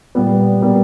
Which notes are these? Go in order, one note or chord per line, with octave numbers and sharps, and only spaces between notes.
A#2 G3 B3
B2 G3 A#3